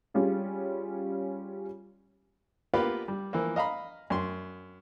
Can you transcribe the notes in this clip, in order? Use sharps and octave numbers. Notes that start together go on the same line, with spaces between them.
G3 C#4 F4 G#4
A#3 B3 F4 G4 B4
G3
E3 F3 A#3
D#5 F5 A#5 B5
F#2 C6